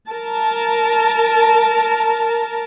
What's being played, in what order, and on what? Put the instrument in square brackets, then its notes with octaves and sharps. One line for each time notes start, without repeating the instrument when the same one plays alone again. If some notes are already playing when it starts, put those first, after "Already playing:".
[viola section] A#4 A5